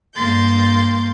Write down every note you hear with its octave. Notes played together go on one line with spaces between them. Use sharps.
G2 A#3 C6 G6 A6